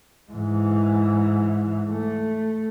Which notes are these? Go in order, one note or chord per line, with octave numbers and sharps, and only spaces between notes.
G#2 E3
A3